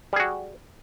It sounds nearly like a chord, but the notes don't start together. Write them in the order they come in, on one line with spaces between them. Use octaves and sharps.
G3 G#4 F#4